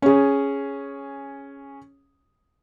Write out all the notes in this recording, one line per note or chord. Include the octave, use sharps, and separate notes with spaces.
C#4 G#4